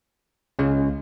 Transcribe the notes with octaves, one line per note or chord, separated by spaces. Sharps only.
C#2 C#3 G#3